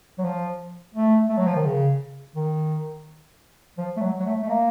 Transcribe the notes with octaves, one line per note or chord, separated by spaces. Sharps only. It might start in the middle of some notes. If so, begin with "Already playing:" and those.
F#3
F3
A3
A3
F#3
F3
D#3
C#3
D#3
F3
A3
F#3
F#3
A3
A3
A#3